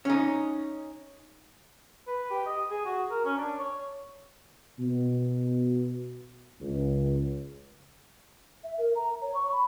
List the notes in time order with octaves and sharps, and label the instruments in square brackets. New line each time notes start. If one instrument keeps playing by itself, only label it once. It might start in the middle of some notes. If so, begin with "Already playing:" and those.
[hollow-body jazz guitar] C#4 D#4
[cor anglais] B4
G4
D#5
G#4
F#4
A#4
C#4
D4
C#5
[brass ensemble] B2
C#2
[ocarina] E5
A#4
A#5
C#5
C#6
B5